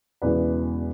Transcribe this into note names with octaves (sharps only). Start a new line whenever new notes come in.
E1 E2 C#3 E3 B3 B4 D5